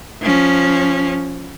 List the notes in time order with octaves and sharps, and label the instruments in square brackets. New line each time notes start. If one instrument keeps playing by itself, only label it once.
[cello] F3 C#4